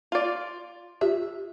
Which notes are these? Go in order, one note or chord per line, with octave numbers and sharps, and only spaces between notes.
F4 D5
F4 G4 E5